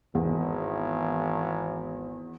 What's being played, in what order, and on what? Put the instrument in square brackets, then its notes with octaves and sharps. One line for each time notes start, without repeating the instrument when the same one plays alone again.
[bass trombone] G#1 [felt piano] E2